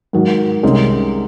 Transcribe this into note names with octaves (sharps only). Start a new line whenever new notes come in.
G#2 D#3 F#3
C2 C3 D#3 G#3 C#4